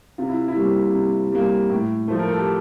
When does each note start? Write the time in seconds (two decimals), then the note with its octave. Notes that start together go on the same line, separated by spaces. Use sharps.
0.18 C3 F4
0.29 E4
0.48 E4
0.56 G3 A#3
0.94 C3
1.32 G3 A#3
1.70 A2
2.08 F3 A3 C5
2.19 A#4
2.28 A4
2.37 G4